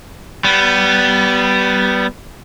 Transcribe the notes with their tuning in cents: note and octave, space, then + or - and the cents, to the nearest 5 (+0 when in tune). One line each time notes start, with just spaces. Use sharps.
G3 -20 B3 +0